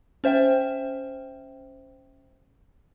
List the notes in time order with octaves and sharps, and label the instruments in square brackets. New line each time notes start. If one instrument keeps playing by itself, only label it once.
[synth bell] C#4 C5 E5 G5